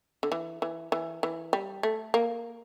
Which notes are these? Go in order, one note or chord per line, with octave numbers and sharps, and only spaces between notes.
D3
E3
E3
E3
E3
G3
A3
A#3